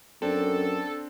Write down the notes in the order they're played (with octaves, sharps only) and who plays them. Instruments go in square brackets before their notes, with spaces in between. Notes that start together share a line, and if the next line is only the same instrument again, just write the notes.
[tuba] F#2 [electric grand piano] C4 D4 [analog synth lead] A4